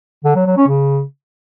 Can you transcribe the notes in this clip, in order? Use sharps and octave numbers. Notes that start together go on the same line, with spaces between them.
D3
F#3
F#3
C#4
C#3